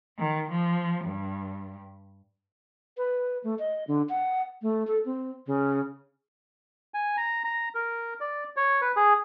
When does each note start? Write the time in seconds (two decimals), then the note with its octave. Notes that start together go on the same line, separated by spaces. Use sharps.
0.18 D#3
0.51 F3
1.05 G2
2.97 B4
3.44 A3
3.59 D#5
3.87 D3
4.09 F#5
4.62 A3
4.87 A4
5.05 C4
5.47 C#3
6.94 G#5
7.17 A#5
7.44 A#5
7.75 A#4
8.21 D5
8.56 C#5
8.81 B4
8.96 G#4